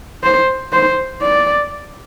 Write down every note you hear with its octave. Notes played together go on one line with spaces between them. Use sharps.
C5
C5
D5